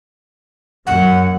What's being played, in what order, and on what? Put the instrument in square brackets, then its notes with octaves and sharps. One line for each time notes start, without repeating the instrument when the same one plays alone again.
[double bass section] F#2 [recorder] F#5